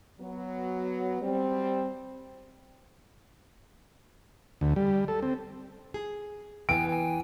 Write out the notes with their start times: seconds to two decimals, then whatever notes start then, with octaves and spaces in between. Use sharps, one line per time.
0.21 F#3 B3
1.22 G3 C4
4.61 D2
4.76 G3
5.08 A4
5.23 C4
5.94 G#4
6.69 E3 B3 G5 G#5 D7
6.88 G5 G#5